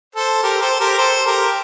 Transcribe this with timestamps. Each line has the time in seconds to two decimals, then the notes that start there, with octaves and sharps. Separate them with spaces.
0.15 A4 C5
0.43 G4 A#4
0.61 A4 C5
0.80 G4 A#4
0.99 A4 C5
1.27 G4 A#4